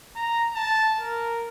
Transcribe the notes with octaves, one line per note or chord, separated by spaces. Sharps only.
A#5
A5
A#4